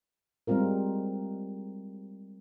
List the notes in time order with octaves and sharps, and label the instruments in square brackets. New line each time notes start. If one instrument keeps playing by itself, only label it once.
[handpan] G3 G#3 C4 F4 A#4